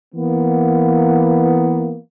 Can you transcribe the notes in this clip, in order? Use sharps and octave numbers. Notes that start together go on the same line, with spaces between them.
E3 A#3 B3